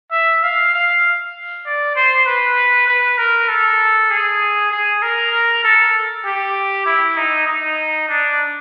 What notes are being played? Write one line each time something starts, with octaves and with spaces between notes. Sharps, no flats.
E5
F5
F5
D5
C5
B4
B4
A#4
A4
G#4
G#4
A#4
A4
G4
E4
D#4
D#4
D4